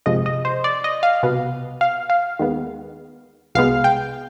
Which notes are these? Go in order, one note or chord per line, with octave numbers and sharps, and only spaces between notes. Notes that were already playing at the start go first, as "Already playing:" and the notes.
G1 F2 C3 F3 G#3 D#5
D#5
C5
D5
D#5
F5
C2 B2 B3
F5
F5
D#2 D#3 G#3 B3
C2 B2 G#3 B3 F5
G5